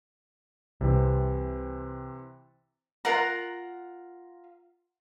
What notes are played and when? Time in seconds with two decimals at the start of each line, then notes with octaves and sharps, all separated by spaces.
0.81 C2 C3 E3 C4
3.05 F4 A#4 F#5 A#5